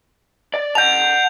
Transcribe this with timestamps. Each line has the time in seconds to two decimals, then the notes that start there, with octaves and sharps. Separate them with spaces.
0.54 D5
0.75 F#5 A5 G6 F7